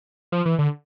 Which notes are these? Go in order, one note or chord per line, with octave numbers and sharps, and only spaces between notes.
F3
E3
D3